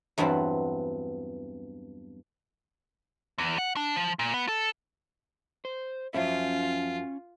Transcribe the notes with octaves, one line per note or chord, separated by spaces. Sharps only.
E2 G2 F#3 B3 C4
E2
F#5
D4
F3
A#2
B3
A4
C5
F#2 F3 C#4 F4 E5